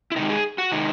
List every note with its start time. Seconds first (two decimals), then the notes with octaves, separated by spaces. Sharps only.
0.12 E4
0.16 C3 D#3 G#3 D#4
0.30 G#4
0.58 F#4
0.72 C3 D#3 G#3 D#4